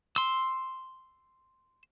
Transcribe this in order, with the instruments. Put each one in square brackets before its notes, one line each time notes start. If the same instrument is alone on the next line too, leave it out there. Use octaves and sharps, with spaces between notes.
[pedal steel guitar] C6 E6